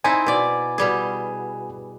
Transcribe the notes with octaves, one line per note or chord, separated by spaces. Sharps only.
C4 D#4 E4 G#5
B2 D5
B2 G3 G#4